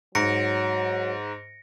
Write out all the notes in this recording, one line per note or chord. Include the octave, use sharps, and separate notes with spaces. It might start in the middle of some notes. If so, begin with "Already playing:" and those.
G#2 F#3 A#6 C#7 D7